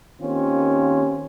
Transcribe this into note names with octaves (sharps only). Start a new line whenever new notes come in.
D#3 A#3 C4 C#4 F4 G4